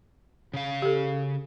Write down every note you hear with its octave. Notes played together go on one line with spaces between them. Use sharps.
C#3 F5
G4 A4